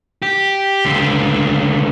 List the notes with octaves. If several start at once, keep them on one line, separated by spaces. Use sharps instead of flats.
G4
C#2 D3